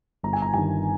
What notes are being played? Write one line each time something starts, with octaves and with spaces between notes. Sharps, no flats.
G1 A#5
G#5
A#5
G2 D#3 G#5